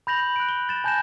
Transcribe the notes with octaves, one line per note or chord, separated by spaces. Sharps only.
B5 G6 A#6 F7 F#7
F#6 D7
G7
A6 E7
G#5 A5 G6 A6 A#6 E7